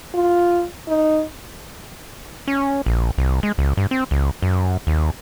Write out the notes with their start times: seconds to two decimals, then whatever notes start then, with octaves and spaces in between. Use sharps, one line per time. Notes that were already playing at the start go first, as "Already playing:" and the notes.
0.14 F4
0.88 D#4
2.48 C#4
2.86 A#1
3.18 C2
3.43 G#3
3.58 C#2
3.77 G2
3.91 C4
4.11 C#2
4.42 F#2
4.87 D#2